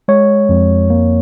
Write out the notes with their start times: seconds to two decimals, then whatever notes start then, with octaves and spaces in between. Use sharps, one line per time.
0.08 G#3 C#5
0.49 F2
0.90 A#3